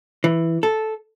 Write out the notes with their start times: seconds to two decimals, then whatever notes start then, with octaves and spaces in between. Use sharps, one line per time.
0.24 E3
0.63 A4